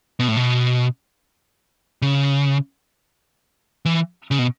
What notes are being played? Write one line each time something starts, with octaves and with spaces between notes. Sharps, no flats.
B2
A2
B2
C#3
E3
C#3
B2